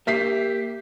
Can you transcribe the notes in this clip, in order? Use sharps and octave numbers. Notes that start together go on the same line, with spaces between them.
A#3 G4 E5 B6 C7